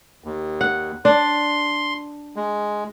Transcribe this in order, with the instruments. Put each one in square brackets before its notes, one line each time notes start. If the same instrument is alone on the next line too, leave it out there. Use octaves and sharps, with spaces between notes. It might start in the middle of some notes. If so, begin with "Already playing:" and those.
[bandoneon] D#2
[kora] F#5
[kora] D4 [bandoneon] C6
[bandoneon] G#3